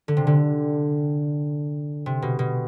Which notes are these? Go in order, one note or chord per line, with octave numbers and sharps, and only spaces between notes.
D3
C3
D3
C3
B2
B2